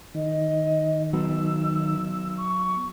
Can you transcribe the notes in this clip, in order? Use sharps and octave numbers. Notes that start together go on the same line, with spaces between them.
D#3 D#5
F#3 B3 E6
C#6